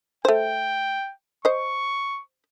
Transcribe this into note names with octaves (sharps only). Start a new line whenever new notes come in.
A3 C5 G5
C5 D#5 C#6